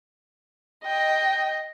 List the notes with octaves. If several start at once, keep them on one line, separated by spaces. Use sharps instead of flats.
D#5 G5